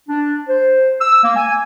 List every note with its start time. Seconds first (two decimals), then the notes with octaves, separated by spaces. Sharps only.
0.09 D4
0.49 C5
1.01 E6
1.23 A#3
1.36 G#5